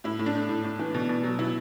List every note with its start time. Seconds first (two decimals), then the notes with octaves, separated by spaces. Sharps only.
0.04 A2 E4
0.19 A2
0.26 D4
0.35 A3
0.49 A2
0.64 A2
0.79 E3
0.95 B2
1.09 B2
1.24 F#3
1.39 B2 E4